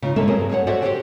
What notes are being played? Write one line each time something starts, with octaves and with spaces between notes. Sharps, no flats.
C#3 D#4 F4
G3 G#3 A#3 C#4 A4 E5
G2 F#3 C4 G#4 A#4
G2 G#4 A4 C#5 F#5
F#4 A4 C5 D5 E5 F#5
G4 A4 C5 C#5 F#5 G5